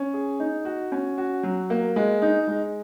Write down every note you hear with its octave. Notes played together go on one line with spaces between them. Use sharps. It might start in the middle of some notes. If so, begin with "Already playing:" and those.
Already playing: C#4
G#4
D#4
F#4
C#4
F#4
F#3
A#3
G#3
D#4
G#3